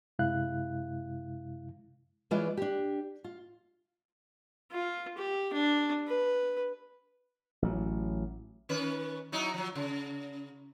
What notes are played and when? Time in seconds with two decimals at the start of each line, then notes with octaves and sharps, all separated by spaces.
0.19 F#2 C3 G#3 E4 F5 F#6
2.31 E3 G#3 F4 B4 C#5 D5
2.57 D4 G4
3.24 F4
4.71 F4
5.18 G4
5.53 D4
6.08 B4
7.62 A1 F#3
8.69 D#3 C#4 B4
9.32 F#3 D#4 E4
9.54 F3 F#3
9.75 C#3